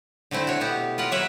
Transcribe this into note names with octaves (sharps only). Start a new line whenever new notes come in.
D3 A3 C4 E4
F#4 C#5
B2 B3 G4
F4 A#4 B4 F#5
F#3 A#3 B4 C#5 E5 F#5